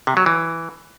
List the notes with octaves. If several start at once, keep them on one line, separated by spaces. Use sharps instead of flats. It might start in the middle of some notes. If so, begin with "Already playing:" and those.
C3
F#3
E3